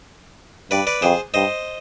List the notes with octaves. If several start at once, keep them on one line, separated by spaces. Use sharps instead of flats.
G2 B4 D5
B4 D5
F2 G#4 C5
G2 C5 D#5